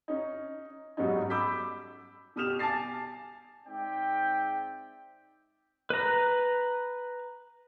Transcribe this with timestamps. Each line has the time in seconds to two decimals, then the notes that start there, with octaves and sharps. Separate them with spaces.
0.08 C#4 D#4
0.97 G#2 F#3 G3 B3 C#4 D#4
1.30 B5 D6 E6 G6 B6
2.36 B2 G4 D#6 F6 E7 F7
2.59 G#5 A5 D6 A6 C7
3.67 G#2 C4 D5 E5 G5
5.90 B4 A#5